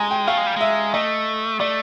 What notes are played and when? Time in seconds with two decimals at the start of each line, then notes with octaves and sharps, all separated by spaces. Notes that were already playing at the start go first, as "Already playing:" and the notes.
Already playing: G#3 G#5 A#5
0.11 G5
0.27 A3 F5
0.37 G#3
0.46 G3
0.56 G#3 E5
0.94 A3 D#5
1.60 A3 D5